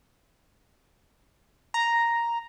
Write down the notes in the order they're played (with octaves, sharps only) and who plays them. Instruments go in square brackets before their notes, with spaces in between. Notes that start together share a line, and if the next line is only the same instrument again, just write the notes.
[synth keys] A#5